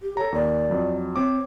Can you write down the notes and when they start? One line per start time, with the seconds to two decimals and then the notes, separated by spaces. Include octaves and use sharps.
0.02 G4
0.17 A4 C#5 A#5
0.32 D#2 D5
0.70 F2 F#3
1.16 C4 C#5 D6